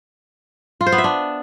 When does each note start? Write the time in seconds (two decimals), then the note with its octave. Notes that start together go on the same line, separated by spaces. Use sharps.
0.81 F4
0.86 C5
0.92 B3
0.98 E5
1.04 D4